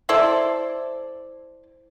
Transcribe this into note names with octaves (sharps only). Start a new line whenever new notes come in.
E4 A4 C5 D5